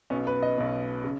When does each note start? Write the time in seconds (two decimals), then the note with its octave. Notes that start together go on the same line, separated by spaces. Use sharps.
0.10 B1 B2 C#4
0.27 B4
0.42 D#5
0.58 B1 B2
1.04 C#3